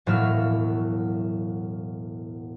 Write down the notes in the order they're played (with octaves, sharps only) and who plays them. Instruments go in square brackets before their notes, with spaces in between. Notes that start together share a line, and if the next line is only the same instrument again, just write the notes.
[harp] E1 A2 F#3 A#3 E6 F6